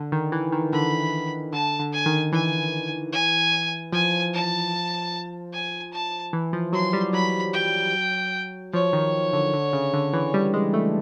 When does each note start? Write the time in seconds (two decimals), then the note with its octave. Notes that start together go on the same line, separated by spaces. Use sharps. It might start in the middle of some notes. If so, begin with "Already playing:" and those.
Already playing: D3
0.12 D#3
0.32 E3
0.52 D#3
0.73 D3 B5
1.53 D3 A5
1.79 D3
1.93 G#5
2.06 D#3
2.32 E3 G#5
3.12 G#5
3.92 F3 G#5
4.33 A5
5.53 G#5
5.93 A5
6.33 E3
6.53 F3
6.73 F#3 C6
6.93 G3
7.13 F#3 B5
7.53 G5
8.73 F3 C#5
8.93 D#3
9.33 D3
9.53 D3
9.73 C#3
9.93 D3
10.13 E3
10.34 G3
10.54 G#3
10.73 A3